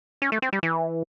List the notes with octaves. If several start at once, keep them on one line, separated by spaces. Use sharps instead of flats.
C#4
A3
C4
G3
E3